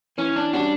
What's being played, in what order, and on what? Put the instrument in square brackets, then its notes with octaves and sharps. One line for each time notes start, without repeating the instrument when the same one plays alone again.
[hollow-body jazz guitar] E3 [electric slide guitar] C#4
[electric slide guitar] D4
[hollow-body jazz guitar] G3 C#4 F#4 [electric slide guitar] D4